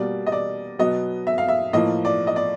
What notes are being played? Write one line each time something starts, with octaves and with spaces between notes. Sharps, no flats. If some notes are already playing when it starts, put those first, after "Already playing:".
Already playing: B2 G3 A#3 D5
D#5
D5
B2 F#3 B3 D#5
E5
F5
E5
A2 F3 A#3 D#5
D5
D#5
D5